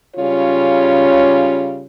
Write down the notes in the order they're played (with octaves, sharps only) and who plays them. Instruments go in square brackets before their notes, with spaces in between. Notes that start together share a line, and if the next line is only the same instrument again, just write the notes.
[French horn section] C#3 G3 C#4 F4 C#5